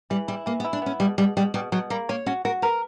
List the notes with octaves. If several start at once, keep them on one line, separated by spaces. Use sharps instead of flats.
E3 G3
G3 E4
E3 A#3
B3
E4
D4
B3 C#4
B2 G3
B2 G3
B2 G3
B2 G3
B2 F#3
G3 A#3
A#3 C#5
C#4 F#4
F#4 A#4
A#4 B4